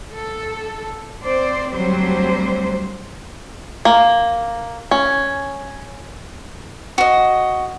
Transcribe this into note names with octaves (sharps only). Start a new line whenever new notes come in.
A4
C4 C5 D5
D2 F#3 G3 C4 C5
A#3
C#4
F#4 D#5